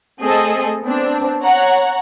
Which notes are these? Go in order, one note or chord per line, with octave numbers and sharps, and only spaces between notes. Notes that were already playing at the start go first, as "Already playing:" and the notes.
A3 C4 G#4 A4 D#5
B3 C4 D4
C#5 F#5 A#5